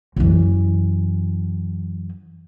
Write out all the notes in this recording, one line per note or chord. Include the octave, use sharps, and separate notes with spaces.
F#2 E3